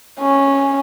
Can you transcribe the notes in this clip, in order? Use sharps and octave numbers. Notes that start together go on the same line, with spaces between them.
C#4